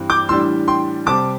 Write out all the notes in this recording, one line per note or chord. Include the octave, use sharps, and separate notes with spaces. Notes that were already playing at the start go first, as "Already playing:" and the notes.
Already playing: G2 E3 G3 C4
D6 G6
A2 E3 G3 D4 C6 E6
G5 C6
C3 G3 C4 A5 D6